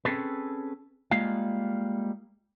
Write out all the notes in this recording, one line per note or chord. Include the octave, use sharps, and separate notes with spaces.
C4 C#4 G#4 A4 B4
G3 G#3 A#3 F4 F5